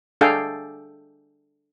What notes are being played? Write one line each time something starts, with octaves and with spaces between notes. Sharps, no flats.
D4 G#4 A4 F5 G5